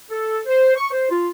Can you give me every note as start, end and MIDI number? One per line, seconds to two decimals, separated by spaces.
0.09 0.39 69
0.46 0.74 72
0.75 0.90 85
0.91 1.07 72
1.09 1.28 65